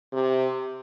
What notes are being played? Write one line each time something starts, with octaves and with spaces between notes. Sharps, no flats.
C3